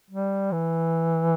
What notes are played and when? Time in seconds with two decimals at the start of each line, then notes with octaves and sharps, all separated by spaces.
0.10 G3
0.52 E3